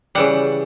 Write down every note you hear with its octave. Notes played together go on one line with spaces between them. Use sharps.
C#3 E3 G3 F#5